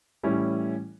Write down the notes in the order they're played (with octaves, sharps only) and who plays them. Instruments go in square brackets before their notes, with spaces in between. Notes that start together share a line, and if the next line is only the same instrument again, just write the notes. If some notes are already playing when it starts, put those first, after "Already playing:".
[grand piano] A2 E3 G3 C#4 E4